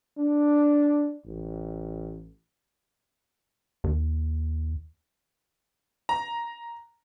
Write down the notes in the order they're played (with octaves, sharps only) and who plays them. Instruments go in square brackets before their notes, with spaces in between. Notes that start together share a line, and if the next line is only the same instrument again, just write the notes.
[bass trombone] D4
A1
[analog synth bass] D#2
[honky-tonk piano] A#5